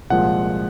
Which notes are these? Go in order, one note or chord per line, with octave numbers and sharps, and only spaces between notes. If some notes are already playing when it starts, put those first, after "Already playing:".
C2 A#2 F3 G#3 F#5